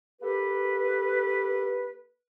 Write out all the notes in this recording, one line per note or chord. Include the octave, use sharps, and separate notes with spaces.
A#3 G4 A4 B4